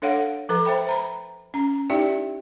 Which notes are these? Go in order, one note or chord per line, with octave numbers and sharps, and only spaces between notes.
D4 A4 C#5 F5 F#5
F3 A4 B4 A#5
C5 E5 G5 B5
C5 A#5 B5
C#4 A#5
D#4 E4 G4 D5 E5 G5